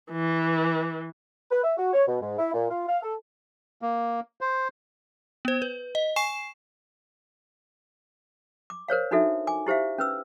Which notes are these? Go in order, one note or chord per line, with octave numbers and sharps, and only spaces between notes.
E3
B4
E5
F#4
C#5
B2
G#2
E4
A#2
F4
F5
A4
A#3
C5
B3 C5
B4
D#5
G#5 C#6 C7 E7
D6
A#4 C5 C#5 F5
D4 D#4 F#4 A4 E5
G#5 D6
E4 G4 C5 E5 F5
C#4 B4 E6